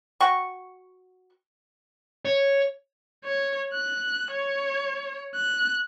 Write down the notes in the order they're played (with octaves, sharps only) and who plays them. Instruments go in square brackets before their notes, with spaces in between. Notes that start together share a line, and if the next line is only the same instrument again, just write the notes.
[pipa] F#4 G5 C#6
[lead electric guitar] C#5
[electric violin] C#5
F#6
C#5
F#6